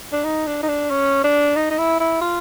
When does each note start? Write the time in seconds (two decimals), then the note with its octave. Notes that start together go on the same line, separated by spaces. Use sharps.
0.12 D4
0.24 D#4
0.47 D4
0.63 D#4
0.68 D4
0.90 C#4
1.24 D4
1.56 D#4
1.70 D#4
1.78 E4
2.00 E4
2.21 F4